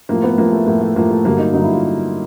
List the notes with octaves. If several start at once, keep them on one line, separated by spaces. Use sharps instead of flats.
A2 F3 A#3
B3
A2 F3 A#3
A3
A2 F3 A#3
A3
A2 F3 A#3
A3
G2 D3 F#3 A#3
D#4
G2 D3 F#3 D#4
E4
F4